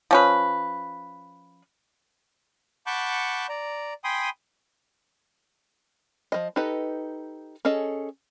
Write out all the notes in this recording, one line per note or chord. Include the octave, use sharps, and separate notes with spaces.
F3 C#4 B4
F#5 A5 B5 C#6 D6 G6
D5 A#5
G5 G#5 B5 C6 D#6
F3 D#5
D#4 G4 A4 B4 D#5
C#4 G#4 A4 D#5